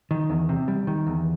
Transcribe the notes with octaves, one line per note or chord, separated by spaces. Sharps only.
D#3
E2
C3
G3
D#3
E2